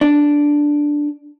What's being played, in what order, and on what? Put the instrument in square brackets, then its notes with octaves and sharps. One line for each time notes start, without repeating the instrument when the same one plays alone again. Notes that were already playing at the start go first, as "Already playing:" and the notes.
[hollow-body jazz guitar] D4